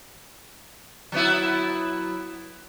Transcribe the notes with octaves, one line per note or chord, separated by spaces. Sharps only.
F#3 B3 E4